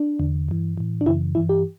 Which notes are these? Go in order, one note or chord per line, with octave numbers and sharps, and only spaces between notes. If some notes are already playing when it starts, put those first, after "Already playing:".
Already playing: D4
E2 D3
G2 E3
A2 E3
D4
F#2 C#3 E3 E4
G2 E3 E4
G4